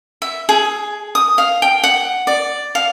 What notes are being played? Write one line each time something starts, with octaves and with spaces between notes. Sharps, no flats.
E5
G#4
D#6
F5
G5
F#5
D5
F5